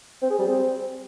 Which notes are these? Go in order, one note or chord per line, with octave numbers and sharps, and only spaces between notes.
C4
G#4
G3
C4